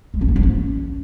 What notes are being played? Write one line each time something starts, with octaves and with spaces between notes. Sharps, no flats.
G#3
C#4
A#3
F3
C#4